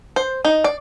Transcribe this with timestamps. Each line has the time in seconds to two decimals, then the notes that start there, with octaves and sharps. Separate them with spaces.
0.16 C5
0.45 D#4
0.64 D5